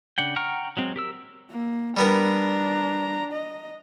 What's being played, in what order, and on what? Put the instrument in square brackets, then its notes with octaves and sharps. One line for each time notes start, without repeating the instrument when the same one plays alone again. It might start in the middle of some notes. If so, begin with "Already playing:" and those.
[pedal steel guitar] C#3 D4 F#5 G5
F#5 G5 A#5 C#6 F6
F#3 G#3 C4
G4 A#4 E6
[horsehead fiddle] A#3
[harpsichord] G3 B3 A#4 [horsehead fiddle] D4 A#5
[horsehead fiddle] D#5